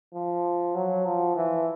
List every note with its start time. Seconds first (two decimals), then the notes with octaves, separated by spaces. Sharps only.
0.14 F3
0.75 F#3
1.05 F3
1.36 E3